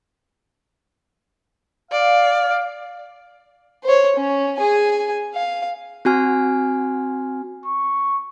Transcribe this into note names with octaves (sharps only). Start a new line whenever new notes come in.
D5 F5
C5 C#5
C#4
G#4 G#5
F5
C4 F#4 G#5 F6
C#6